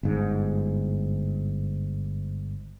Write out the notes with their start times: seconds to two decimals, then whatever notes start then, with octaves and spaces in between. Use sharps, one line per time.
0.03 G1 G#2